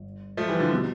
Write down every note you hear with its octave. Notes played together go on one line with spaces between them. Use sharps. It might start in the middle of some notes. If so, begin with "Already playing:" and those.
Already playing: G1
F3 A3
E3 G3
D3 F3
B2 G3